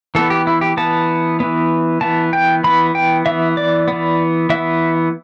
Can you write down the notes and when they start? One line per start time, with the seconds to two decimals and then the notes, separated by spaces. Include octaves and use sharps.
0.15 E3 B3 A4
0.30 G4
0.47 E4
0.61 G4
0.77 E3 B3 A5
1.40 E3 B3
2.01 E3 B3 A5
2.33 G5
2.64 E3 B3 B5
2.95 G5
3.26 E3 B3 E5
3.57 D5
3.88 E3 B3
4.50 E3 B3 E5